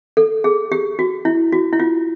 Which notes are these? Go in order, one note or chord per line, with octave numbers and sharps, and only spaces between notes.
A4
G#4
G4
F#4
E4
F#4
E4
F4